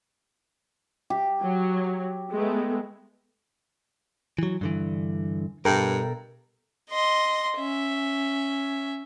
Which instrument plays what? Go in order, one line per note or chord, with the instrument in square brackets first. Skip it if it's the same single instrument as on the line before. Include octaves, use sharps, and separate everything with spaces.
[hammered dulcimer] G4
[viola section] F#3
G#3 A3 B3
[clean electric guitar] E3 F#3
G2 D3 E3
[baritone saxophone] G2 [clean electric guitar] B2 A4 A#4
[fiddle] D#5 C6
C#4 E5